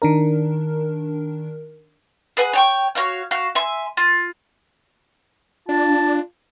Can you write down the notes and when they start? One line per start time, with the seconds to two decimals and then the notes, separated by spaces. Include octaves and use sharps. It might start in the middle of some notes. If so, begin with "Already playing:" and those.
0.02 D#3 D4 A#4
2.37 G#4 B4 F#5 G#5
2.53 C#5 G5 C#6
2.95 F#4 C#5 F5 F6
3.31 F#4 F5
3.55 E5 G#5 C6
3.97 F4
5.69 D4 F4 A5